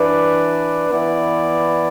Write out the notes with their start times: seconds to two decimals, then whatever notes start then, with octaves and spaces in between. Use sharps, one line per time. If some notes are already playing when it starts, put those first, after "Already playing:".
Already playing: E3 D4 B4 D5
0.90 E3 B3 E4 D5